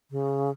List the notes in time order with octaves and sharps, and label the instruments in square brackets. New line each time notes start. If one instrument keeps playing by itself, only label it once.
[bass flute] C#3